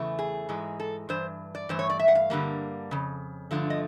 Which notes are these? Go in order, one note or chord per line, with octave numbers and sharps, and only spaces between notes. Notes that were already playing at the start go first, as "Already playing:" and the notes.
Already playing: E2 C#3 E3 A3
G#4
G#2 E3 G#3
A4
G2 E3 C5
D5
G2 E3 A3 C5
C#5
D5
E5
F#5
F5
G2 D3 G3 A#3
F2 C#3
G2 D3 F3 A3
D#5